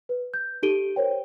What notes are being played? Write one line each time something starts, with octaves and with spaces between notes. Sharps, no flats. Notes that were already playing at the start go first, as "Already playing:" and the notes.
B4
G6
D#4 G4 A4 D7 D#7 G7
A#4 C5 C#5 G5